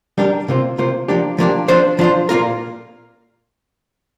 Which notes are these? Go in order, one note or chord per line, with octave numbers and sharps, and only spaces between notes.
G3 D4 G4 A#4
C3 A#3 F4 C5
C3 A#3 F4 C5
F3 A#3 D4 G4
F3 A#3 D4 G4
F3 D4 F4 C5
F3 D4 F4 C5
A#2 A#3 F4 A#4